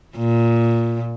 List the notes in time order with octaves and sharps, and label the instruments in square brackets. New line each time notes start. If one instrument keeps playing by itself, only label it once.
[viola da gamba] A#2